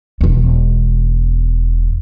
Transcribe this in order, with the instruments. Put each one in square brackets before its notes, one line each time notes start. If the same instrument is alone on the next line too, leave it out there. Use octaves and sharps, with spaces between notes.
[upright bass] E1 E2